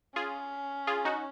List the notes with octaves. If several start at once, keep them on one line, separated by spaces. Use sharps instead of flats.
C#4 F4 G#4
F4 G#4
D#4 F#4